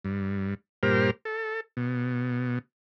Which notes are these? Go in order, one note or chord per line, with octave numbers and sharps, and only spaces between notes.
G2
G2 A#2 G4 A#4 C5 F6
A4
B2